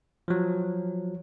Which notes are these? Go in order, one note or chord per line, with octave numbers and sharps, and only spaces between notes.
F3 F#3